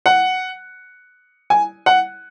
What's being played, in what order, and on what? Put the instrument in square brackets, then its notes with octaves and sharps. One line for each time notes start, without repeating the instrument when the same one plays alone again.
[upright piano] F#5
G#5
F#5